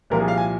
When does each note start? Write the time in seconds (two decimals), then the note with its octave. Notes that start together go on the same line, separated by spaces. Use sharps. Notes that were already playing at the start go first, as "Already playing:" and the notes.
0.10 C2 A#2 F3 A#4
0.20 G#4
0.28 F5
0.37 G#5